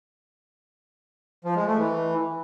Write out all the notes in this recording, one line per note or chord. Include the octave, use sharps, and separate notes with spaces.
F3
G#3
A3
E3